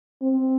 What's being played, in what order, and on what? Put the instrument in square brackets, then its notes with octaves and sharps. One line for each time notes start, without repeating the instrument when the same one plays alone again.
[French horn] C4